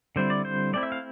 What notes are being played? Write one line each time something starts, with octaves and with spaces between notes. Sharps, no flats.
D3 G3 C4 E4 C5
D5
C5
A3 C4 E4 D5
E5
F5